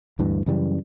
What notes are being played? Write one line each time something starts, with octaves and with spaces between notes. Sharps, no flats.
D2 G2 E3
F#2 C#3 E3 G3